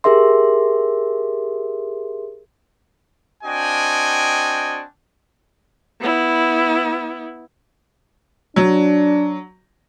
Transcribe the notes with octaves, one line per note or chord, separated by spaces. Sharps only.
G4 G#4 A#4 E5 C6
C4 D4 F#4 D#5 G5 G#5
B3 E4
F#3 D4